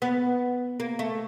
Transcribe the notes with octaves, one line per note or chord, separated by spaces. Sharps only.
B3
A#3
A3